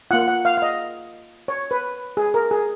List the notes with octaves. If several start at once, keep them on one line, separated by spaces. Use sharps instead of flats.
A#3 F4 F#5
F#5
F5
F5
D#5
C#5
B4
G#4
A#4
G#4